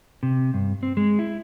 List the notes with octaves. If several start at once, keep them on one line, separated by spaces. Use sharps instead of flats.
C3
G2
C4
G#3
E4